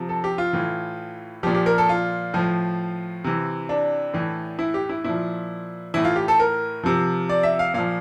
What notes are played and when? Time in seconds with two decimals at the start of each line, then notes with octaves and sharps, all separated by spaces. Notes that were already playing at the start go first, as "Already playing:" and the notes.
Already playing: C3 F3
0.09 A4
0.24 G4
0.38 F4
0.53 A2 E3
1.43 A#2 F3 G4
1.54 G4
1.66 A#4
1.78 A4
1.89 F4
2.34 A2 F3
3.24 C3 E3
3.69 D4
4.14 A2 E3
4.59 E4
4.74 G4
4.89 E4
5.04 A#2 F3 E4
5.94 A2 E3 E4
6.05 F4
6.16 G4
6.28 A4
6.39 A#4
6.84 C3 F3
7.29 D5
7.43 E5
7.59 F5
7.74 A#2 F3 F5